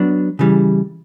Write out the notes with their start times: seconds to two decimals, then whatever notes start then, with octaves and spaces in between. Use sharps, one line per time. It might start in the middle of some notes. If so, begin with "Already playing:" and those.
Already playing: F#3 B3 D4
0.39 C#3 E3 G3